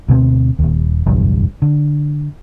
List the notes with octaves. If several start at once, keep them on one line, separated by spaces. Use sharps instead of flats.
D2 B2 A#3 C4
D#1 D#2
F#1 B1 E2 G2
D3